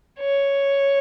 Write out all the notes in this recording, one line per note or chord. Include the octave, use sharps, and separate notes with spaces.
C#5